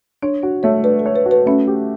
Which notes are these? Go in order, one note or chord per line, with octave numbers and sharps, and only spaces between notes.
D4 C#5
D4 F#4
A3 C#5
D4 B4
A4
C#5
B4
F#4
B4
A3 C#4
G4